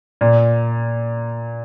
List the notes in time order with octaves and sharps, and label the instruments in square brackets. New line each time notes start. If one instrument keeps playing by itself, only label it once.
[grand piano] A#2